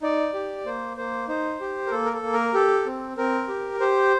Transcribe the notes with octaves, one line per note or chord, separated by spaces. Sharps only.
D#4 D5
G4
A#3 C5
A#3 C5
D#4 C5
G4
A#4
A#3 A4
A#4
A4
A#3
A#4
G4 A4
C4
C4 A#4
G4
G4 C5